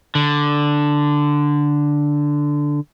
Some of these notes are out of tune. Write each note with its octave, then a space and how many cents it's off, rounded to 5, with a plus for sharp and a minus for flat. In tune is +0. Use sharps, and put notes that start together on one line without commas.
D3 +0